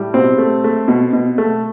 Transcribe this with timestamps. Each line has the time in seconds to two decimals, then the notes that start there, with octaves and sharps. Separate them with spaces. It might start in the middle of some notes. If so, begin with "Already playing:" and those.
Already playing: A2 G3
0.14 B2 C4
0.38 A3
0.64 A3
0.88 B2
1.13 B2
1.38 A3